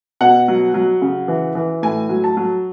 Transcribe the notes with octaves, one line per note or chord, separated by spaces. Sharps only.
B2 F#5
F#3
F#3
C#3
E3
E3
A2 G#5
F#3
A5
F#3